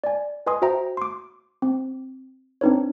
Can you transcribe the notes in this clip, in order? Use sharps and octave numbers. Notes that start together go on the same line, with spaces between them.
D5 G#5
B4 D#5 G#5 C6 D#6
F#4 C5 E5 G5 A#5
C6 D6
C4
C4 D4 D#4 B4 C#5